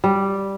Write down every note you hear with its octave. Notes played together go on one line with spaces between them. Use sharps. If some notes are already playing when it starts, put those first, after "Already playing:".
G3